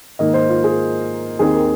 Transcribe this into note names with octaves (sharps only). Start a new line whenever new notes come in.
G#2 D#3 A#3 D#5
C5
F4
G#4
D#2 D#3 C4 G#4
A#4